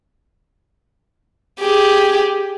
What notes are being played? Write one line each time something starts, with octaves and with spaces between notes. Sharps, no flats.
G4 G#4